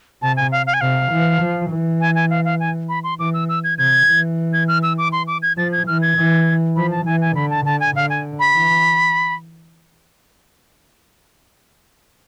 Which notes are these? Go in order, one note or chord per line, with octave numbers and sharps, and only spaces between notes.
C3 A5
G#5
F5
F5
G#5
C3 F5
E3
F3
E3
G#5
G#5
F5
F5
G#5
B5
C6
E3 D6
E6
E6
G#6
C3 G#6
E3
G#6
F6
E6
D6
C6
D6
G#6
F3 A6
G#6
E3 F6
G#6
E3
F3 B5
A5
E3 G#5
G#5
D3 B5
A5
D3 A5
G#5
D3 F5
G#5
B5
E3